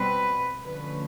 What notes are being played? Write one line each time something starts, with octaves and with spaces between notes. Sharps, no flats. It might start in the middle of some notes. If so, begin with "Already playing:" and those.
Already playing: B2 G3 C4 B4
D3 F3 A3 C#4 B4